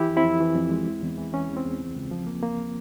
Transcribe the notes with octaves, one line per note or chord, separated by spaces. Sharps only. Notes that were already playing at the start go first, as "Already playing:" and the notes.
Already playing: E3 E4 G4
F2
C4 E4
F2
E3
F2
G#3
E2
E2
E3
E3 C#4
E2
C4
E2
C#2
C#2
F3
A#3
A#3